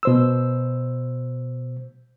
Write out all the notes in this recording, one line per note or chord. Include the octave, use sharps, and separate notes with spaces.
B2 C5 E6